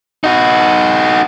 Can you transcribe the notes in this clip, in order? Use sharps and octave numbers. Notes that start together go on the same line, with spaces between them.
D#4 F#4